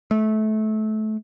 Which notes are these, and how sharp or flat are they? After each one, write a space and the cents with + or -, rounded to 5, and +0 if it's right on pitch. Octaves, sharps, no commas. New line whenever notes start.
A3 -25